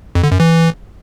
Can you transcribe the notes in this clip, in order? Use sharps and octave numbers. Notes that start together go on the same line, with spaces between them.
F2
D3
F#2
E3